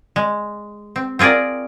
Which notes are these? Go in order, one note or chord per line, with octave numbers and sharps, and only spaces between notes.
G#3
C4
C4 F4 G#4 A#4 D5